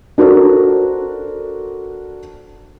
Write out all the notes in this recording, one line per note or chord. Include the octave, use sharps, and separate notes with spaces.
D4 F#4 A4 A#4 C5